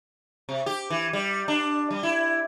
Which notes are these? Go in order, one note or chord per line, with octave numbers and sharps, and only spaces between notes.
C3
G4
E3
G3
D4
G3
E4